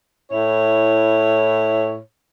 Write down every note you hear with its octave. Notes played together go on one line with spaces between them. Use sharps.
A2 E4 C#5